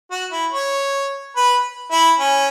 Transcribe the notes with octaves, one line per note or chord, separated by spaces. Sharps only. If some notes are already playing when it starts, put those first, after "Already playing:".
F#4
E4
C#5
B4
E4
C#4